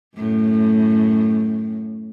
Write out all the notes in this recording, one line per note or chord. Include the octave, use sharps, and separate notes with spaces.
F#2 A2